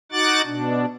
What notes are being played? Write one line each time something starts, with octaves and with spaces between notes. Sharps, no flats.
D#4 F#4 F#5 D6 F#6 A6
B2 D4